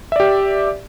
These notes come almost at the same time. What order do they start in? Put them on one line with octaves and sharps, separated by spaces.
E5 D5 G4